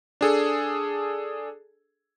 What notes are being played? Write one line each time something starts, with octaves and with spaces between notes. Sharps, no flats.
D4 G#4 A4